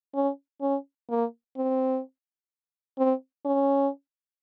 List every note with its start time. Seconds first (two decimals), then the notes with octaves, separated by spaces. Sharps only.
0.15 C#4
0.61 C#4
1.10 A#3
1.57 C4
2.98 C4
3.45 C#4